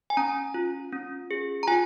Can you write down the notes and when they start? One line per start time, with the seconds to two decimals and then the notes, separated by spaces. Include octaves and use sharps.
0.10 G#5
0.17 C#4 A#5
0.54 F4
0.92 C#4
1.31 G#4
1.63 A#5
1.67 F4 G#5